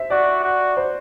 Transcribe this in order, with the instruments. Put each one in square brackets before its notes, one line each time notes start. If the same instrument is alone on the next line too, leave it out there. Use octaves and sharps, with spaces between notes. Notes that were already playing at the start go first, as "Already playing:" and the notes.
Already playing: [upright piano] C5 E5
[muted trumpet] F#4 [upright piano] D5
[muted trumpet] F#4
[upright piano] C5